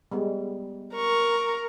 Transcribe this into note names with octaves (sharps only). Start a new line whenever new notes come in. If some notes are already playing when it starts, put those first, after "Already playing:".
G3 G#3 B3
A#4 C#6